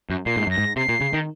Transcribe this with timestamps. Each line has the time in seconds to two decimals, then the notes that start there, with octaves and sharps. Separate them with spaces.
0.10 F#2
0.26 A#2 C7
0.36 G#2
0.47 F#2 A#6
0.58 G#2
0.76 C3 C7
0.89 A#2
1.01 C#3
1.13 D#3